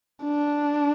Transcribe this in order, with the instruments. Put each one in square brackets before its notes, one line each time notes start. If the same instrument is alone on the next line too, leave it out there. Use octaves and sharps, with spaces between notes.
[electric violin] D4